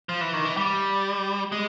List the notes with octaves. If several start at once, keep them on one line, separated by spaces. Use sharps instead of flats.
F3
E3
D#3
E3
G3
G#3